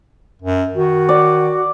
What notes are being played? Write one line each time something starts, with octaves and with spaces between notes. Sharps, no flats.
F#2
D#3 F#4
D5